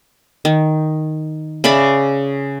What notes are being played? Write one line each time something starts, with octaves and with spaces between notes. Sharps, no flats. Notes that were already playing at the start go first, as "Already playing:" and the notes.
D#3
C#3 D5 E5 B5